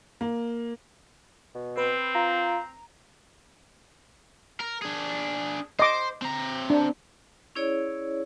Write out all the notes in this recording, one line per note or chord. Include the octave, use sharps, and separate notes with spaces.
A#3
B2
C4 B4
F4 A#5
A#4
D4 G#4
C5 D#5 D6
C4 A#5
D4
C#4 E4 G#4 C#5 D5